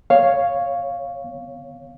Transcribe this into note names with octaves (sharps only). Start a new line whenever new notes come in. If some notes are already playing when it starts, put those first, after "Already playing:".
C#5 F5